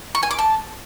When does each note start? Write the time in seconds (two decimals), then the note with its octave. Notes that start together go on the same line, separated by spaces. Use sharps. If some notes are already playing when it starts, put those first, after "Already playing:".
0.15 C#6
0.23 G#5
0.31 D6
0.39 A5